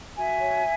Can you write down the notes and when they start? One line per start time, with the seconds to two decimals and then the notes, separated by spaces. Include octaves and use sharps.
0.16 F#4 E5 G#5
0.40 C#5